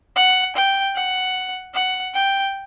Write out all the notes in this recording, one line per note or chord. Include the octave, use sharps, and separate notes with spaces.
F#5
G5
F#5
F#5
G5